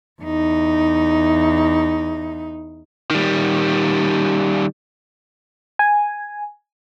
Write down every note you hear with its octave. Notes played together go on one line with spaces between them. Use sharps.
E2 D#4
D#3 G3
G#5